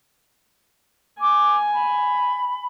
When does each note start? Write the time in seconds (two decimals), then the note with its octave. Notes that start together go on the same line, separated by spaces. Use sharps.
1.20 G#5 D6
1.73 B5